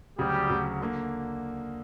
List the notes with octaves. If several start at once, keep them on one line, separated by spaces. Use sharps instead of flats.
D2 C#3 F#3 G3 G4
D2 C#3 F#3
D3 A#3